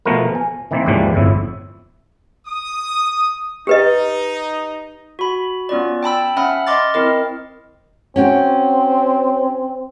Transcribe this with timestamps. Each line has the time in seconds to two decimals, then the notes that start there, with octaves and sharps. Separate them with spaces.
0.05 B2 F3 A3 B3 A#4
0.35 G#5
0.71 D#3 E3 A#3 C4
0.86 D#2 G#2 C#3 E3 F3 G3
1.14 G1 F2 A2 E4 E5
2.47 D#6
3.67 D#4 G4 B4 D#5
5.19 F#4 B5
5.69 B3 C#4 F4 D5
6.03 G5 A5 B5 E6
6.36 C#4 E5 F#5 B5 F6
6.67 D#5 C6 D6 F6 A6
6.94 C4 E4 A#4 D#5
8.16 C4 C#4 F#4 G5